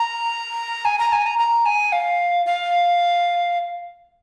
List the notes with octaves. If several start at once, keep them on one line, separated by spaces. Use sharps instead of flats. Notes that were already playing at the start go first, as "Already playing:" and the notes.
Already playing: A#5
G#5
A#5
G#5
A#5
A#5
G#5
F5
F5